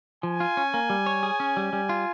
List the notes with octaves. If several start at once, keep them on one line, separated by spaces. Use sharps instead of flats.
F3 G#5
F4
C#4
A#3
G3
C#5
G#4
C#4
G3
G3
F4